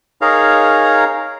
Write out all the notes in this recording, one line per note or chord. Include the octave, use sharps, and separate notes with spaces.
D#4 G#4 A#4 C#5 F5 A#5